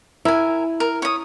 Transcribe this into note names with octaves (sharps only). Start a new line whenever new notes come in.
E4 A#4 G#5
A#4
C#5 D#6